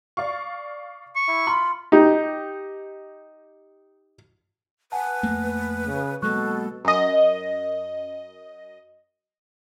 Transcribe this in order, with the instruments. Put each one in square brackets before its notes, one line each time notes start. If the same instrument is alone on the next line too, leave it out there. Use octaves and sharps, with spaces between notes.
[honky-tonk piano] D5 F5 C#6
[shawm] C#6
[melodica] E4 E5
[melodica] F4 [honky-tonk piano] B5
[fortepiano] D#4 G4
[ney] B4 [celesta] F#5 G#5 A5
[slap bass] F2 A3 A#3
[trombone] C#3
[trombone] B2 [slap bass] F#3 G#3 A#3 [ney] A4 [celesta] C#6 F#6
[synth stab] F#2 D#5